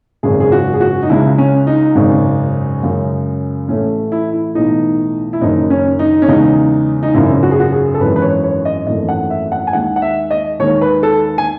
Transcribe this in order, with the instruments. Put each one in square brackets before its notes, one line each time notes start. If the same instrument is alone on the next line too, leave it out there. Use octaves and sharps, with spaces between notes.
[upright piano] G#1 F#2 C#3 G#3 G#4
G#4
F#4
G#4
F#4
D#4
C#2 C#3 G#3 E4
C#4
D#4
G#1 F#2 C#3 G#3
F#2 C#3 G#3
A1 A2 E3 A3 C#4
E4
E4
B1 A2 E3 D#4
E4
F#1 F#2 D#3 D#4
C#4
D#4
C#4
E2 C#3 G#3 D#4
D#4
G#1 F#2 C#3 E4
F#4
G#4
F#4
G#4
A4
G#1 F#2 E3 G#3 B4
B4
C#5
C#5
D#5
G#1 F#2 E3 A3 D#5
F#5
E5
F#5
G#5
D#2 D#3 G#3 F#5
F#5
E5
D#5
D#2 D#3 G#3 C#5
B4
A4
G#5